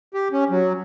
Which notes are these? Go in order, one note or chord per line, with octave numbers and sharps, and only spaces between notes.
G4
C#4
F#3